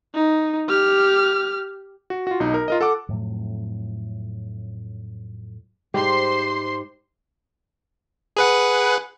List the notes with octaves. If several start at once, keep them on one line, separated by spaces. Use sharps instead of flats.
D#4
G4 F6
F#4
F4 F#4
B1 D#4
A#4
F4 A#4 D#5
A4 F#5 D6
F2 A2 F#3
G#2 G3 G4 C5 C6 C7
G#4 B4 F#5